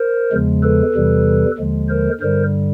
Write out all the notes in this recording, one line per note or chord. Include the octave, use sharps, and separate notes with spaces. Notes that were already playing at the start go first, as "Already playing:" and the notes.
Already playing: A#4 C5
E2 C#3 F3 G#3
A4 B4
E2 C3 E3 G3
D#2 D3 F3 G#3
A#4 C5
G2 D3 G3 A#4 C5